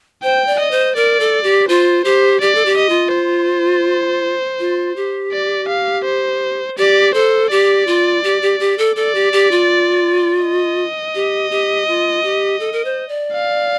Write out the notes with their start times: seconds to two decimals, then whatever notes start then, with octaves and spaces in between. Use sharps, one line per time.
0.23 C5 G5
0.47 D5
0.59 D#5
0.71 C5
0.96 A#4 D5
1.20 A4
1.44 G4
1.68 F4 C5
2.05 G4 C5
2.41 G4 D5
2.55 A4
2.65 G4
2.77 D#5
2.89 F4
3.15 C5
4.60 F4
4.96 G4
5.32 D5
5.68 F5
6.05 C5
6.78 G4 D5
7.14 A4 C5
7.51 G4 D5
7.87 F4
8.24 G4
8.42 G4
8.60 G4
8.78 A4
8.96 A4 D5
9.15 G4
9.33 G4
9.51 F4
10.42 D#5
11.15 G4
11.51 G4
11.88 F4
12.24 G4
12.60 A4
12.73 A#4
12.85 C5
13.09 D5
13.34 F5